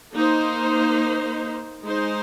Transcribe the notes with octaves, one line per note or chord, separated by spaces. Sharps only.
A#3 D#4 C5
G#3 D#4 C5